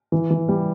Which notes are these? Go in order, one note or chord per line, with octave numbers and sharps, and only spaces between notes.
E3
E3
G3